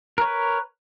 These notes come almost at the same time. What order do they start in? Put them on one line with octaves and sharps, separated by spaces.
A#4 C#5 B4